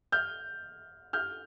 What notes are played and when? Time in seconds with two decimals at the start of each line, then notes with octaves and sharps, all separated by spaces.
0.12 F6 G6
1.13 F6 G6